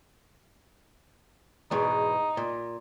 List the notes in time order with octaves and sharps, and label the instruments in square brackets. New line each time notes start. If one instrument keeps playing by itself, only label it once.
[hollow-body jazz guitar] E2 G#2 B2 [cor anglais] D#4
[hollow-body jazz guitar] A#2